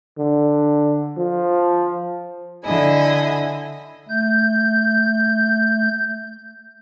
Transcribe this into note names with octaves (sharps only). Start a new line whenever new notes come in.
D3
F3
D3 E4 D#5 G#5
A3 G6